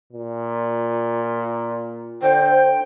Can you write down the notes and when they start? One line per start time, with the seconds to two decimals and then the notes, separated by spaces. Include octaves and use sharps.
0.13 A#2
2.23 D3 C5 G5